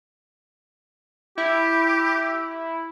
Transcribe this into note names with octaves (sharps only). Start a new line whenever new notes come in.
E4 G4